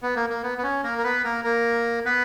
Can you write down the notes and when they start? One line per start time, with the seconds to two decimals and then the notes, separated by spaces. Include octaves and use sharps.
0.02 B3
0.16 A#3
0.30 A#3
0.43 B3
0.58 B3
0.63 C#4
0.84 A#3 A#4
0.98 A#4
1.04 B3 B4
1.24 A#3 A#4
1.44 A#3 A#4
2.05 B3 B4